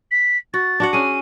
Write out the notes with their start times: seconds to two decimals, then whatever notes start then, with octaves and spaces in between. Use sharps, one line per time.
0.11 B6
0.54 F#4 A6
0.80 D4 F#4 F#5
0.93 C#4 G#4 D#7